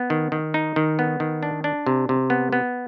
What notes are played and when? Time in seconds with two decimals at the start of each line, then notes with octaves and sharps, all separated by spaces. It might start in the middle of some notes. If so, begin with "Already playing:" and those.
Already playing: B3
0.10 D#3
0.32 D#3
0.54 D#4
0.76 D#3
0.99 B3
1.20 D#3
1.43 D4
1.64 D4
1.86 C3
2.09 C3
2.30 B3
2.53 B3